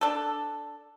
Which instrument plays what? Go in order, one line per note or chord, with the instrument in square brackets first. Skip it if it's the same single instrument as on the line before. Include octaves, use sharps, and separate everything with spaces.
[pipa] D4 A4